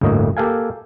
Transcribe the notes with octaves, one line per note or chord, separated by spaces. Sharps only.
G1 D2 A2 A#3 D#5
A#3 G4 A4 F5 G#5